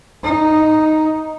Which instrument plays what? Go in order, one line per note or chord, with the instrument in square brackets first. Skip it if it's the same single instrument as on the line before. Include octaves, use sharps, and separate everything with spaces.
[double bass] D#4